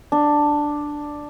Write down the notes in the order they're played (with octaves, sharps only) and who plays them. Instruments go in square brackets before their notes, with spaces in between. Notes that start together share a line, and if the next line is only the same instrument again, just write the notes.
[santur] D4